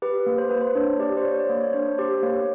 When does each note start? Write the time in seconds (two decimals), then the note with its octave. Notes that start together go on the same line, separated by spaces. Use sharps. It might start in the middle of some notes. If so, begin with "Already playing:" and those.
0.02 G4 B4
0.26 A#3
0.38 C5
0.49 A#3 B4
0.61 C5
0.75 D4 C#5
1.00 G4 D5
1.17 C5
1.24 A#3 C#5
1.39 D5
1.49 A#3 C#5
1.62 C#5
1.73 D4 C5
1.98 G4 C5
2.23 A#3 C#5